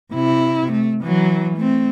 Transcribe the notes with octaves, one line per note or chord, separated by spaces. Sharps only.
C3 E4
A3
E3 F#3
A3 C4